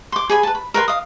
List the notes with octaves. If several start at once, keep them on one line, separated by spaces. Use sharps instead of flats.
C6 D6
G#4 G#5 B5
B4 A5
B5
A#4 B4 G#5 C6
F5 D#6